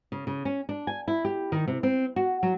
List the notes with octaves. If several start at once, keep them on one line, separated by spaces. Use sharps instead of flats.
C#3
C#3
C#4
D4
G#5
E4
G4
D#3
C3
C4
F#4
F#3